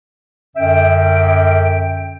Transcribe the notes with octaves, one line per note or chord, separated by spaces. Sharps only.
F#2 D3 E5 G5